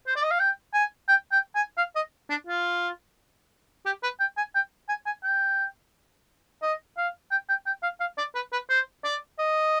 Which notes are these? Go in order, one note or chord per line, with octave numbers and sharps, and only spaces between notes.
C5
D5
D#5
F5
G5
G#5
G5
G5
G#5
F5
D#5
D4
F4
G4
B4
G5
G#5
G5
G#5
G#5
G5
D#5
F5
G5
G5
G5
F5
F5
D5
B4
B4
C5
D5
D#5